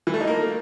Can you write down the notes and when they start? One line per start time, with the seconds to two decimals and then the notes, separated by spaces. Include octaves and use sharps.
0.07 E3
0.14 A3
0.21 D#4
0.27 A#3